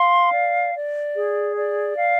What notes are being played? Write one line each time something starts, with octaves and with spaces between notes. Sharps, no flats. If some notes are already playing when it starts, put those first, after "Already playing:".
Already playing: F5 C6
D5
D5
G#4
D5
F5